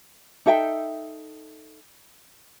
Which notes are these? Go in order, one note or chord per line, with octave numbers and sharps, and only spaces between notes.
D#4 A4 E5 G5